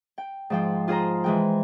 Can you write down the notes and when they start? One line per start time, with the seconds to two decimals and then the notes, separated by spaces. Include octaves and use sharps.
0.18 G5
0.50 G#2 F3 G5
0.88 F4 G#4 C5 A#5
1.24 E3 G#3 G5